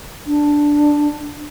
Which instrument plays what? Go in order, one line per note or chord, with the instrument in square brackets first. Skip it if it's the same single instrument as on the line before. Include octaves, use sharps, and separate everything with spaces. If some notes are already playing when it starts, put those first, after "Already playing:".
[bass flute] D4